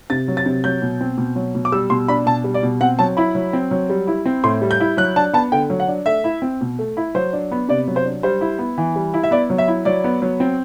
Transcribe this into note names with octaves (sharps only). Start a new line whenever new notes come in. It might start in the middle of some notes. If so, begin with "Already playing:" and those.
C3 A6
F#3
A6
C3
F#3 G6
B2
C4
B2
F#3
B2
D6
G3 E6
B2 C6
D4 B5
B2 A5
G3
D5
B2
C4 F#5
F#3 A5
E4 B5
F#3
C4
F#3
G3
E4
C4
A2 C6
G3
G6
E4
F#3 F#6
D4 A5
B3 A5
D3 G5
F#3
F#5
D4
A3 E5
E4
C4
B2
A3
E4
F#3 C5
D4
B3
C3 D5
F#3
C5
D4
G3 C5
E4
B3
E3
G3
E4
E5
B3 D5
F#3
E5
E4
F#3 D5
B3
F#3
C4